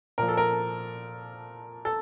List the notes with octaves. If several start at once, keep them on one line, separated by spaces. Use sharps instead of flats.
A#2 F3 A#4
A4
A#4
A4